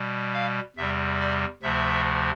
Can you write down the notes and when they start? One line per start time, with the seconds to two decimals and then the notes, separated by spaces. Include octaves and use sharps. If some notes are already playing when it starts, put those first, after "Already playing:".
Already playing: B2 G3
0.34 F5
0.76 E2 C3 G3 E5
1.20 D5
1.62 D2 C3 F3 A3 E5